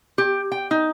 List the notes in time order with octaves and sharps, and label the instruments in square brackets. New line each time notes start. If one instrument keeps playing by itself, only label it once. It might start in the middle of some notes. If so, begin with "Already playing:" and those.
[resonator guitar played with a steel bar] G4
G5
D#4